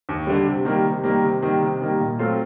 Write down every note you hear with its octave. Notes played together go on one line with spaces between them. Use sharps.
D#2
D3 G3
C3
D#3 G3 A#3
C3
D#3 G3 A#3
C3
D#3 G3 A#3
C3
D#3 G3 A#3
A#2
F#3 A3 C4 F4